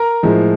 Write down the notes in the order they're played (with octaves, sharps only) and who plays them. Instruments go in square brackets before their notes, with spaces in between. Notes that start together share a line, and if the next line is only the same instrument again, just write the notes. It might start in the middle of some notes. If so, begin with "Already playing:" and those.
Already playing: [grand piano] A#4 A#5
A2 F3 G#3